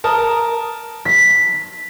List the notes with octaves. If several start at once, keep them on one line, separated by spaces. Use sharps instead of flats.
A#4 A5 D#6
B6